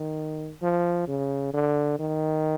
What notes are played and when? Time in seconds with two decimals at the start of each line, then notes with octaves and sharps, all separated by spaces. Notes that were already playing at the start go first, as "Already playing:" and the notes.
Already playing: D#3
0.62 F3
1.07 C#3
1.53 D3
1.99 D#3